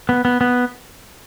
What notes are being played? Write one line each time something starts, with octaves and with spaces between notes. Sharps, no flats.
B3
B3
B3